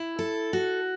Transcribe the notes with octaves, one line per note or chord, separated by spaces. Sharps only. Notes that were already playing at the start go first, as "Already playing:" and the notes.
Already playing: E4
A4
F#4